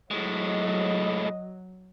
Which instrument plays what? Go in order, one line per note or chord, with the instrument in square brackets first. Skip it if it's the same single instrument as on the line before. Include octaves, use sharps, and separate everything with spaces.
[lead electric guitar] A2 G#3 [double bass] F#3 [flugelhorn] D#5